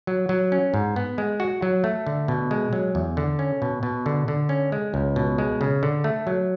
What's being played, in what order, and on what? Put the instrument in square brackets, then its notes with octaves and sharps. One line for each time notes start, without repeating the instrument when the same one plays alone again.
[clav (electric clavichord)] F#3
F#3
C#4
G#2
B3
G#3
F#4
F#3
A3
D3
B2
G#3
F#3
E2
D3
C#4
B2
B2
D3
D3
C#4
G#3
C#2
B2
G#3
C#3
D3
A3
F#3